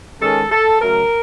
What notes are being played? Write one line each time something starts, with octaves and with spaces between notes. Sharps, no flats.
D#3 G#3 C#4 A4
A4
C#3 F#3 A3 A#4